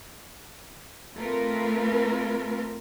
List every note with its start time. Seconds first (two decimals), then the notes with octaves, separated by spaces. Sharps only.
1.15 A3 A#3 C4 F4 A#4 B4